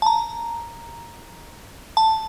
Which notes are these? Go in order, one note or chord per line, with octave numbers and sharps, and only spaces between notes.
A5
A#5
A5